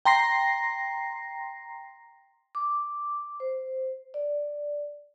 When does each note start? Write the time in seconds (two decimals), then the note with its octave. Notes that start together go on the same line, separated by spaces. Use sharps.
0.05 G5 A#5 C6 A#6 C7
2.55 D6
3.40 C5
4.14 D5